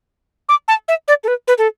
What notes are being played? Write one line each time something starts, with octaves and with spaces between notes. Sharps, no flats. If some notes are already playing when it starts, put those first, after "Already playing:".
D6
A5
E5
D5
A4
B4
B4
A4